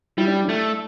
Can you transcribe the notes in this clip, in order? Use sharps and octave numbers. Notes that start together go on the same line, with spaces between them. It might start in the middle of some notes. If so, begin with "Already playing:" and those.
G3 E4
D4
A3 D4